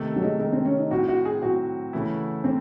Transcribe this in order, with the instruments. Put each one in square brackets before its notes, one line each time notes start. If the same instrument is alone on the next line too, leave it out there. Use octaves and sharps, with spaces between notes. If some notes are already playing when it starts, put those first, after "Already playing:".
Already playing: [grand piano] C3 D#3 A3
[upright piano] F#3
G#3
[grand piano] C3 D#3 A3 [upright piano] G#3
[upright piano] C4
C#4
D#4
[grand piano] A2 F#3 C4 [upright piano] F#4
[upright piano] F#4
G#4
[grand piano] A2 F#3 C4 [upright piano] F#4
[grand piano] C#3 E3 A3 C#4 E4
[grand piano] C#3 E3 A3 [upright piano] C4